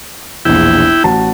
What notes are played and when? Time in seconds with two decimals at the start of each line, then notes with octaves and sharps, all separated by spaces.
0.45 E1 A#1 E4 G5
1.04 A1 F#4 A5